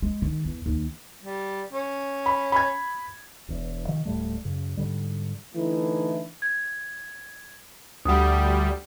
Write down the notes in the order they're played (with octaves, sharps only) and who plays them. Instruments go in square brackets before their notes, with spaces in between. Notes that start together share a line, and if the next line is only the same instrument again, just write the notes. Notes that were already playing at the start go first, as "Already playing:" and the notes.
[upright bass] G#3
D#3
E2
D#2
[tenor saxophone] G3
C#4
[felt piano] B5
B5 G#6
[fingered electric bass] E1 E2
C3 D#3 F3
D1 A2 G3 A3
F#2 C#3
G#2 D3 G3
[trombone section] D3 E3 A3 D#4 E4
[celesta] G#6
[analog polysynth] D2 G3 [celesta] F#5 D#6